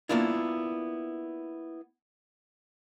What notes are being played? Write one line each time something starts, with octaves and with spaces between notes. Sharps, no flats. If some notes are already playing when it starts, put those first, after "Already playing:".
A#3 B3 D4 E4 F4